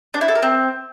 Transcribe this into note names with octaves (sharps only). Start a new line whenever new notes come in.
D4
E4
A4
A#4
C4